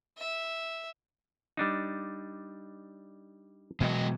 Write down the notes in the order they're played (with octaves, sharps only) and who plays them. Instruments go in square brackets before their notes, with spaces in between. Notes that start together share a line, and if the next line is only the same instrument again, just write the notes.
[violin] E5
[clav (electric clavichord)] G3 D4 D#4
[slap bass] B2 E3 F#3 [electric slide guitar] G#3 F#4 D#5